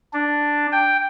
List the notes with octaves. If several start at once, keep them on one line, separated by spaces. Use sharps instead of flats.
D4
G5